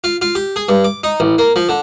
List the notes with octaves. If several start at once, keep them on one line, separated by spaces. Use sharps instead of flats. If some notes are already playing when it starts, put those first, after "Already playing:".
F4
F4
G4
G#4
G2
D6
D#4
A1
A#3
F3
D3